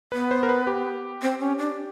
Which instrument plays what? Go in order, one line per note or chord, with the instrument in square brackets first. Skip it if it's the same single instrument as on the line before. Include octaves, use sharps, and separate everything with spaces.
[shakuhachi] B3 [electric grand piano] B4
[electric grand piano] C5
A#4
B4
G4
[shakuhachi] C4
C#4
D4